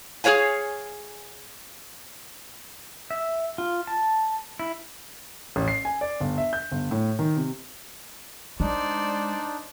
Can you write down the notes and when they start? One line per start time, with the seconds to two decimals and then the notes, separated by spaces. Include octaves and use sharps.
0.24 G#4 A#4 C#5 F5 G#5
3.11 E5
3.58 F4
3.87 A5
4.59 E4
5.56 A1
5.68 C7
5.85 G#5
6.01 D5
6.20 G1
6.38 E5
6.53 G6
6.71 G1
6.91 A2
7.19 D#3
7.37 C3
8.60 G#3 D4 D#4 C5 D5